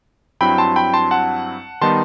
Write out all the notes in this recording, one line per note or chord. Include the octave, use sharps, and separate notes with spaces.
G2 F#3 C4 E4 G5 B5
A5 C6
G5 B5
A5 C6
F#5 A5
D#3 G3 B3 D#4 A5 C6